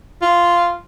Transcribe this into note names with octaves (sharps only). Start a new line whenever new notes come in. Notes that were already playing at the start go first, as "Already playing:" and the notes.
F4